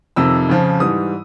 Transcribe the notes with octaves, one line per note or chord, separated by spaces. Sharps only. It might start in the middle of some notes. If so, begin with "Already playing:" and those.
F2 C3 D#3 E6
F2 C#3 F3
G#2 E3 G3 D#6